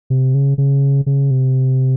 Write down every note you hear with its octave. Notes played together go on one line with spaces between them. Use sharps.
C3
C#3
C#3
C#3
C3